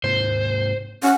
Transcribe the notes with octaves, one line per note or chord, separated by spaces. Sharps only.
G#2 C3 A#3 C5
C#4 F#5